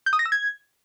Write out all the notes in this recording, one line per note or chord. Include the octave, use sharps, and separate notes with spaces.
G6
D#6
A#6
E6
G#6